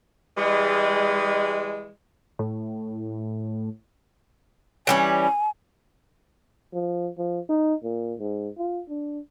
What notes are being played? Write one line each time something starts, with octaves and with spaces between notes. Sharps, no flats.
E3 G3 G#3
A2
E3 G3 C#4 G#5
F3
F3
D#4
A#2
G#2
F4
D4